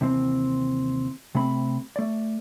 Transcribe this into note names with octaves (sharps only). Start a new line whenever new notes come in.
D#2 C3 E3 C4
C3 A3 C4 B5
A3 D5